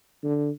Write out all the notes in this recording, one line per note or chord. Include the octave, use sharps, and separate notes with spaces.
D3